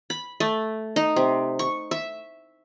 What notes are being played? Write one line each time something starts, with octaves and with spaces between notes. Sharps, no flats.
B5
A3
D#4
C3
C#6
E5